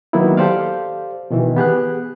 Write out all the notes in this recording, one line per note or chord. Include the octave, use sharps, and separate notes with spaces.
D#3 F#3 A#3 B3 E4
G4 A4 C5 D5 F5
B2 D#3 E3
B3 G4 G#4 F#6